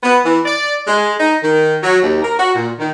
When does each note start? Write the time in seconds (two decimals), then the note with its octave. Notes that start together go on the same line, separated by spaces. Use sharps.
0.03 B3
0.25 E3
0.45 D5
0.87 G#3
1.19 D#4
1.43 D#3
1.83 F#3
2.03 D#2
2.22 A#4
2.38 F#4
2.55 A#2
2.79 D#3